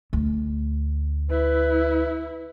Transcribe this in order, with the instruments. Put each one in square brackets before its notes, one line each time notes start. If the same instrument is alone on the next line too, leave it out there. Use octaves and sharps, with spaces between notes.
[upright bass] D2
[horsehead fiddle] E4 [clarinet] B4